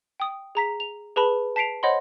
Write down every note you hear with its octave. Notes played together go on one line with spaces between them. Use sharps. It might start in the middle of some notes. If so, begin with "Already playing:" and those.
G5 D#6
G#4 A#5 B6
F7
G#4 B4 A5 B5
A5 B6 C7 D7 F7
C5 C#5 D#5 F#5 B5 C6